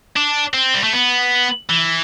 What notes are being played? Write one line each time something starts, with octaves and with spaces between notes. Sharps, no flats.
D4
C4
G3
A3
B3
E3